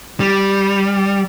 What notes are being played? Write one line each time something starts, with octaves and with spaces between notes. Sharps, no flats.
G3